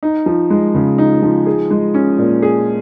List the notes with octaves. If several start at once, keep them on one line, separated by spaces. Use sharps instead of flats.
D#4
F3
G#3
C#3
D#4
F3
G#4
G#3
C#4
A#2
G#4